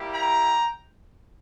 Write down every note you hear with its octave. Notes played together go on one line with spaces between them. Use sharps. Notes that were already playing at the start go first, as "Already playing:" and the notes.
Already playing: G3 A#3 E4 G4
G5 A#5